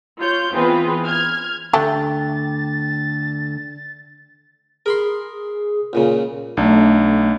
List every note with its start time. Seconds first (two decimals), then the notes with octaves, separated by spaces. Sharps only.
0.21 F4 C#5 G6
0.52 E3 B3 C4 F4 G#4 B4
1.05 F6 G#6
1.73 D2 D3 A3 G4 G5 A6
4.86 G#4 A#4 B5 C6
5.93 C#2 A#2 C#3
6.57 B1 A3 D4